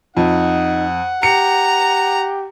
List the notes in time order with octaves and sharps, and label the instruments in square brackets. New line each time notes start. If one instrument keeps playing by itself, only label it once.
[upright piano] F2 [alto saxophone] D#4 [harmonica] F#5
[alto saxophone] G4 [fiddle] A#5 [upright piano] C#7